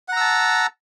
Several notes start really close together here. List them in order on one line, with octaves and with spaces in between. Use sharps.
F#5 A#5 E6 A5